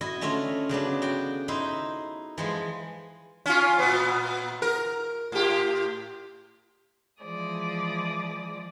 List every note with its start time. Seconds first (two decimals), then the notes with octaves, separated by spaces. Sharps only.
0.01 E4 F#4 D#5
0.21 D3 A3 C#4 F4 D#5
0.69 C#3 F#3 B3 D4
1.02 F#4 G5
1.48 D#4 E4 C5
2.38 E3 F3 G#3
3.46 C#4 F4
3.79 A#2 B3
4.62 A#4
5.32 A2 G4
7.23 E3 F3 G#3 D5 D#6